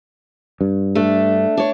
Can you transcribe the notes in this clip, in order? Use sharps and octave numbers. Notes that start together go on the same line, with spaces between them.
G2
A3 D4
D4 C#5